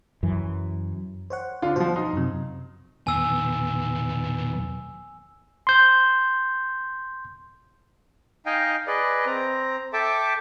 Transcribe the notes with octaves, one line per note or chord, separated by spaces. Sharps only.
F#2 E3
C5 C#5 F#5
D3 F4
B2 F3 C5
D#4 C6
F#2 C3
B1 E2 A#2 D#3 B3 G#5 E6
C6 G6
D#4 D#5 F5 G5 G#5
G#4 B4 D5 D#5
C4 A#5
A4 E5 G5 A5 D6